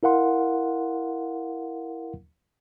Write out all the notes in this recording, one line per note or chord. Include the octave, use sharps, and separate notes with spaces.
E4 A#4 F5 F#5 C6